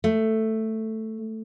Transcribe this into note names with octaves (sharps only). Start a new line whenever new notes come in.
A3